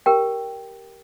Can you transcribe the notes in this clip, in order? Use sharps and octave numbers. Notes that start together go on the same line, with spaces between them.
G4 A#4 G5